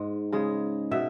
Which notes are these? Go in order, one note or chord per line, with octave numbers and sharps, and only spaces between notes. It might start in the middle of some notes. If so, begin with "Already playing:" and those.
Already playing: G#2 G#3
C#3 G#3
B2 E5